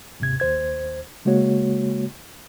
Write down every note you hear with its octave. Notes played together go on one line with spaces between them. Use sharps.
D#2 G#2 C3 G#6
D#2 C5 G#6
C#3 G#3 A#3 F#4 C#5